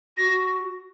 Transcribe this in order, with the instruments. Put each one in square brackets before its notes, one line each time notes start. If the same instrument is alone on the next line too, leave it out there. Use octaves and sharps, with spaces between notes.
[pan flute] F#4 [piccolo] A#6